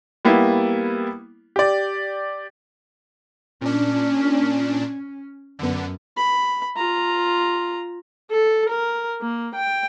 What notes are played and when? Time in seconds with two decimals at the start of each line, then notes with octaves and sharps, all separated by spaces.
0.25 G3 A#3 B3 E4
1.56 G4 D5
3.61 A#2 C#4 D4
5.59 F#2 D3 B3
6.17 B5
6.76 F4 A#5
8.31 A4
8.70 A#4
9.21 A#3
9.55 G5